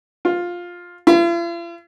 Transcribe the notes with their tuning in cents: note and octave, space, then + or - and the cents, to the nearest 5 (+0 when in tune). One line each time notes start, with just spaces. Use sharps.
F4 +10
F4 -45